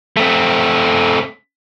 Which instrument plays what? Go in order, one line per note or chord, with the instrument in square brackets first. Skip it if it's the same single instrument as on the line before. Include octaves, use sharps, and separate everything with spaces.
[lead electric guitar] A3 C4